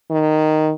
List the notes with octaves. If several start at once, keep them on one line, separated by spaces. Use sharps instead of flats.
D#3